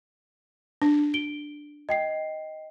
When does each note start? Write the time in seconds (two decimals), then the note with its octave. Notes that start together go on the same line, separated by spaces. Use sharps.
0.82 D4
1.14 D7 G7
1.89 D#5 G5 C7